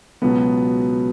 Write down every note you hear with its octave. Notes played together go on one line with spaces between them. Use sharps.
C#2 B2 F#3 B3